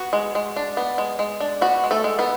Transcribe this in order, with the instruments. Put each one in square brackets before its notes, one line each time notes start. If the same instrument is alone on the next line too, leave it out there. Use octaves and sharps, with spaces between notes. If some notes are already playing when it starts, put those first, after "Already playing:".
Already playing: [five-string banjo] B3 F#4
G#3
G#3
D4
B3
G#3
G#3
D4
B3 F#4
G#3
A3 A4
G#3
B3 B4